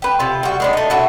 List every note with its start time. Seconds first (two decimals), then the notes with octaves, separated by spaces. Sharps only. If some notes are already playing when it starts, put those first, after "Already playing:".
0.02 G4 B4
0.19 C3 F4
0.43 G3 F#4
0.60 G#3 B3 D4
0.73 A3 D#4
0.90 B2 D4 E4 F#4